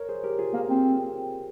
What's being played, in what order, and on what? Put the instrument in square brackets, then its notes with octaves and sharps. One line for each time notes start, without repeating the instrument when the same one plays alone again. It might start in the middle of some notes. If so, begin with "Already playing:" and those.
Already playing: [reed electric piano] A#4 C#5
G#4 C5
G4 A#4
F4 G#4
[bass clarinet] A#3
C4